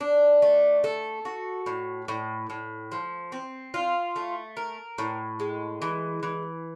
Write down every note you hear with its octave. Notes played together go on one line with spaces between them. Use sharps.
D4
A3
A4
F#4
A2
A2
A2
F3
C4
F4
A3
A#4
A2
G#3
E3
E3